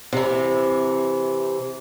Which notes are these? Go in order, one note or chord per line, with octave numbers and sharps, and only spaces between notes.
C3 E3